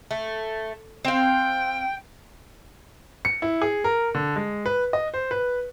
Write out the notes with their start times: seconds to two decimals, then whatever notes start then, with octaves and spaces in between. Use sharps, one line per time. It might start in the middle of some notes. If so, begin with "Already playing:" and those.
0.11 A3
1.05 C4 F5 G5
3.25 C#7
3.42 E4
3.62 G#4
3.84 A#4
4.15 D3
4.36 G#3
4.66 B4
4.93 D#5
5.14 C5
5.31 B4